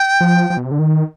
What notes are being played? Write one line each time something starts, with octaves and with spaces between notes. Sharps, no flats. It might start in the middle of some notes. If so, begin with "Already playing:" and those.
Already playing: G5
F3
F3
B2
C3
D3
D#3